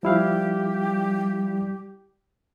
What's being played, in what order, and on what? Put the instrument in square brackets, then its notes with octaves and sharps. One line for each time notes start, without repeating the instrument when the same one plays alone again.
[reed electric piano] F3 E4 F5 [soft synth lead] G3 [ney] G4